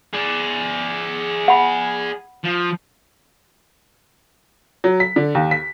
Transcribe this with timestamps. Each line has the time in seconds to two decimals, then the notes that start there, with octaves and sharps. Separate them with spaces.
0.13 G#4 D5
1.48 F#5 B5
2.44 F3
4.84 F#3
5.00 B6
5.16 D3
5.35 D#2
5.51 B6